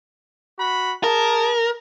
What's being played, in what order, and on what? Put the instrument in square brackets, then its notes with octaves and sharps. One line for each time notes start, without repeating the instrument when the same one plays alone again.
[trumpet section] F#4 B5
[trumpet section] G#4 A5 [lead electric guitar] A#4